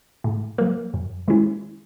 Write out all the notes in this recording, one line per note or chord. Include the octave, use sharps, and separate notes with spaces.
A2
F#3 A#3
F#2
D#3 G#3 C#4 E4